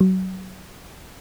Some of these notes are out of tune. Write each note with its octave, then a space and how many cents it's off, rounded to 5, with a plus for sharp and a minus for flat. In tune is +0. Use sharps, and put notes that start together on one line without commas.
F#3 +25